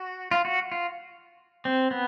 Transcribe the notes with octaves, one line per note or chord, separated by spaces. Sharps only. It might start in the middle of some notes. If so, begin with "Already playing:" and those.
Already playing: F#4
F4
F#4
F4
C4
B3